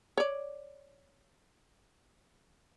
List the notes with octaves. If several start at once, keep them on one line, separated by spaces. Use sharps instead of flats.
C#5 D5